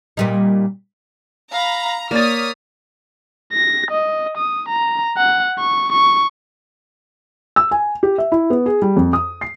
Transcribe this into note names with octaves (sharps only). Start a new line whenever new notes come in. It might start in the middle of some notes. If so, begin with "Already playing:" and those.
A#2 G3 D#4
F5 A#5 B5
A#3 C#5 D5 D#6 F6 A6 B6
A#6
D#5
D#6
A#5
F#5
C#6
C#6
E6
G#5
G4
E5
E4
B3
G#4
G3
F2
D#6
C7